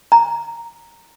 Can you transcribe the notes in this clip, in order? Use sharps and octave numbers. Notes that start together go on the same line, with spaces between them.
A#5